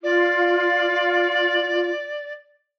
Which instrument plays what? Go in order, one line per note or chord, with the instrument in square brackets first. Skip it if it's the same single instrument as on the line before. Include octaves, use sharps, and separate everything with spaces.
[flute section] F4 [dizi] D5